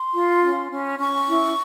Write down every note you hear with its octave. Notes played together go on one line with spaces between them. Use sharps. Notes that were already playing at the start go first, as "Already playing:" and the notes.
Already playing: C6
F4
C#4
C#4
C#4 C#6
E4